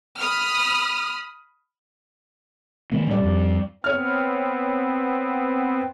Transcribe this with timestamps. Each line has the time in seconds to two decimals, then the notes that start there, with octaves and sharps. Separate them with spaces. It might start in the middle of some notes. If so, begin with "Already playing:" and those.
0.20 B5 D#6 F6
2.92 D#3 G#3 A#3
3.07 A2 G3 D5
3.23 F2
3.84 B3 C4 C#5 F6